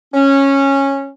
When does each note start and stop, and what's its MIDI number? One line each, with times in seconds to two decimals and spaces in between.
0.13 1.08 61